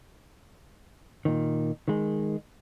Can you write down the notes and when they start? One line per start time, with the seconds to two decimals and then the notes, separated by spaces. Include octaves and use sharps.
1.25 A#2 D#3
1.88 D#3 G#3